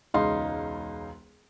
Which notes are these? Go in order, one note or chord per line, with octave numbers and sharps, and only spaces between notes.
E1 C#2 D#4 F5 C6